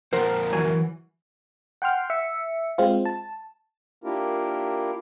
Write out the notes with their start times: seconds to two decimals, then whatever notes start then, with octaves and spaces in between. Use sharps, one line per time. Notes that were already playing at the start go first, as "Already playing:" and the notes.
0.13 F2 A#2 A#4 C5 F#5
0.53 E3 F#3 G#5
1.82 F#5 G5 C6 F6
2.10 E5 C#7
2.78 G#3 C4 F4
3.05 A5
4.04 A#3 D4 E4 F4 G4 A#4